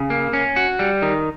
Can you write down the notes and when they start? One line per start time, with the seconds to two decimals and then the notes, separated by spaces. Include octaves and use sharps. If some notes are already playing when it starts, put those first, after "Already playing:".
Already playing: C#3
0.10 A#3
0.33 C#4
0.56 F#4
0.79 G3
1.02 D#3